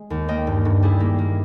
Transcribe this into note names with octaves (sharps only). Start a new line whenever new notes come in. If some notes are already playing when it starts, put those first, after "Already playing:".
Already playing: G#3
D#2
A#3 D#5 G5
G2
G2
G3 E4 G#4
A#3
A#3